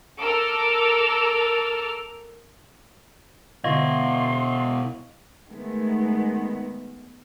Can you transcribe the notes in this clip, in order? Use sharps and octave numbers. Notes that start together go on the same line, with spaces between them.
A4 A#4 D6 E6 F6
B2 D3 E4 D#5 F5 C6 C#6
D#3 G#3 A3 B3